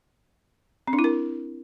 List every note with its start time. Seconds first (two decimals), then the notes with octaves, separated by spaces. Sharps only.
0.88 C4
0.93 D4
0.99 E4
1.04 A#4